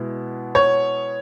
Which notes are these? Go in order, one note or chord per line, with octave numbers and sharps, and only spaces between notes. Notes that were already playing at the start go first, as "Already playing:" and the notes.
Already playing: B2 G#3 B3 E4
C#5